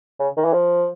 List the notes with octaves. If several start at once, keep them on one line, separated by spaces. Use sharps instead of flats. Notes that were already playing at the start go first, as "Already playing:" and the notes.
C#3
D#3
E3
F3